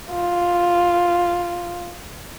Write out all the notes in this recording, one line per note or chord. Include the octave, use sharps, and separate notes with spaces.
F4